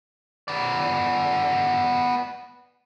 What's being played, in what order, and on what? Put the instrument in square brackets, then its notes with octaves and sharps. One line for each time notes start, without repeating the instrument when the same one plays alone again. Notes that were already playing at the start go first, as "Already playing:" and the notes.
[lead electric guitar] B3 D5